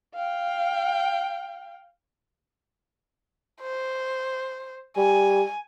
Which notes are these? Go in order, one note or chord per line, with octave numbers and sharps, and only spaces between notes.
F5 G5
C5
G3 G#5